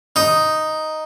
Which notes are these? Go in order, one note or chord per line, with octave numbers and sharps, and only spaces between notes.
D#4